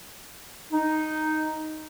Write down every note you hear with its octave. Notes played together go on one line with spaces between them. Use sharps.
D#4